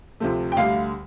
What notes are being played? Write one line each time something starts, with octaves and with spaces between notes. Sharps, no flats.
D2 C3 F3 A3
G5
D2 D3 G3 F5